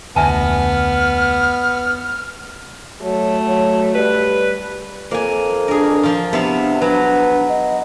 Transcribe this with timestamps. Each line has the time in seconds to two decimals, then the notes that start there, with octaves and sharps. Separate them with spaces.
0.16 F1 D2 B3 E5 G#5 A5 F6
3.03 F#3 A3
3.47 F#3
3.95 G3 B4
5.11 F2 A#3 G#5
5.68 D4 G#4 A#4
6.03 F3 F4
6.33 C3 B3 D4 E4 F5
6.81 F#3 B4
7.49 D#5